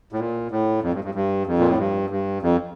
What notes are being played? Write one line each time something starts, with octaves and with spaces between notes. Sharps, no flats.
A2
A#2
A2
F2
G2
G2
G2
F2
A#2
A2
G2
G2
F2